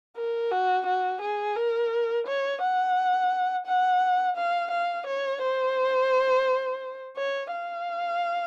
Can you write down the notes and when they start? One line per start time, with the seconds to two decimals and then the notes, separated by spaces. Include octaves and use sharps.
0.16 A#4
0.51 F#4
0.86 F#4
1.21 G#4
1.56 A#4
2.27 C#5
2.61 F#5
3.66 F#5
4.37 F5
4.71 F5
5.07 C#5
5.42 C5
7.17 C#5
7.52 F5